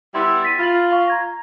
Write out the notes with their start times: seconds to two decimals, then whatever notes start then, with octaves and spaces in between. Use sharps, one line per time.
0.15 G3 B3 E4 C6 E6
0.42 A6 B6 D#7
0.59 F4 B5 A6 F#7
0.92 F5 C#6
1.08 A#5 G#6 A#6